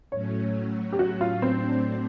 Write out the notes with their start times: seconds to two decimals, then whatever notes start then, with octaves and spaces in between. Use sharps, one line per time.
0.11 A2 F#3 A3 C#4 C#5
0.92 G4
0.99 F#4
1.21 F4
1.42 A2 F#3 A3 C4 D4